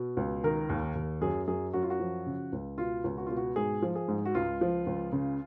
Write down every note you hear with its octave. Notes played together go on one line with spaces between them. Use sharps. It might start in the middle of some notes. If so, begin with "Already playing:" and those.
Already playing: B2
C#2
D#3 A#4
D#2
D#2
F#2 G#4
F#2 G#4
F#2 F#4
F4
F#4
F3
C#3
C#2
B2 F4
C#2
F#4
B2 F4
F#4
G#2 G#4
F3
G#4
G#2
F#4
C#2 F4
F3
C#2
C#3